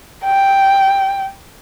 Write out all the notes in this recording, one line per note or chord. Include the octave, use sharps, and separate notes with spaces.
G5